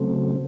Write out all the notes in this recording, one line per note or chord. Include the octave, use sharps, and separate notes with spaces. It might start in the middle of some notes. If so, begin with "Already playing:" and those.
Already playing: C#3 F#3 A3 C4